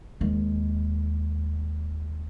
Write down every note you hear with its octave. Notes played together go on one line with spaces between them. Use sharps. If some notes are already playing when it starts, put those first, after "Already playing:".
D#2 G#3